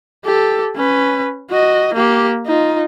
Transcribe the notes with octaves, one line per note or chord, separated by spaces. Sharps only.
G4 A4
C#4 B4
F#4 D#5
A#3 G4
D#4 F4